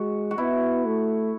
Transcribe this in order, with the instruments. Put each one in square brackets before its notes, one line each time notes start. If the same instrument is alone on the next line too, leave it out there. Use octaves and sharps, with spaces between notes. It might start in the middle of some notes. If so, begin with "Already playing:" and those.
Already playing: [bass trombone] G#3 [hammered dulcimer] F#4
[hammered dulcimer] F#4
[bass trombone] B3 [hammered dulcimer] E4
[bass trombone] A3